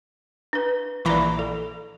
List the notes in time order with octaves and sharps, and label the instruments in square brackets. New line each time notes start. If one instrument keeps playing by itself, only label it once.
[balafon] D4 B4
[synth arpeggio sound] A#1 E3 A#5 [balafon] D5 B5 C#6
[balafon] A4